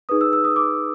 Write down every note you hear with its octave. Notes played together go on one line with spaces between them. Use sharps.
D#4 G#4 B4 D#6
E6
E6
D#6
D6